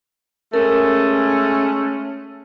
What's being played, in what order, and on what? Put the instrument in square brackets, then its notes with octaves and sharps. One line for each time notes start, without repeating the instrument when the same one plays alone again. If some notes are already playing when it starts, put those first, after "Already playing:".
[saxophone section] G#3 A3 C#4 [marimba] A#4